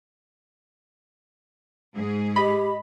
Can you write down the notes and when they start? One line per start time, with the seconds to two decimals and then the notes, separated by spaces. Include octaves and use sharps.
1.94 G#2 G#4
2.36 G4 D#5 B5